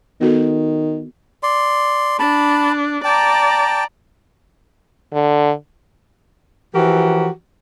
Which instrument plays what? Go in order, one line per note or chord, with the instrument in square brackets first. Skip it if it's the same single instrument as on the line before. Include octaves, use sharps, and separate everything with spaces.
[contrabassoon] D#3 [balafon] B3 F#4 A4
[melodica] D5 C6
[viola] D4 [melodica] A5 B5
[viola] D5 A#5 [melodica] G5 A5
[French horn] D3
[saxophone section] E3 F3 F#4 G4 A#4